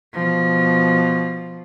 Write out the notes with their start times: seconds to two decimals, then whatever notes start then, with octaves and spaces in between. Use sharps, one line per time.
0.13 B2 F3